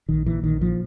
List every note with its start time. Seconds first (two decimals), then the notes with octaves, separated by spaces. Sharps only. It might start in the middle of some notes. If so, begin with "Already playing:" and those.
0.09 A#1 D#3
0.26 A#2 E3
0.43 A#1 D#3
0.61 A#2 F3